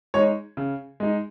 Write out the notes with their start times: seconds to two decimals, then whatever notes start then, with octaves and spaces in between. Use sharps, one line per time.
0.14 G#3 D#4 C#5
0.57 C#3
1.00 G#3 D#4